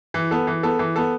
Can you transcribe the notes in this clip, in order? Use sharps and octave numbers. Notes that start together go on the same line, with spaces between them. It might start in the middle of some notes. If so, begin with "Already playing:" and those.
E3
B3 A4
E3
B3 A4
E3
B3 A4